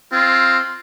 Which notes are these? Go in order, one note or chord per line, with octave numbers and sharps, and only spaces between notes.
C4 F4